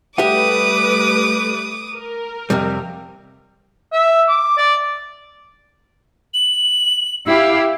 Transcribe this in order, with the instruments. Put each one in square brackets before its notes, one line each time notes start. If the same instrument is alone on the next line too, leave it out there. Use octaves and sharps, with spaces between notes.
[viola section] G3 A3 B4 [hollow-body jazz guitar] G4 E5 F#5 [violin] D6 D#6
[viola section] A#4
[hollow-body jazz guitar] F2 C3 G3
[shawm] E5
D6
D5
[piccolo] F#7
[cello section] E4 G4 F5 [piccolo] E6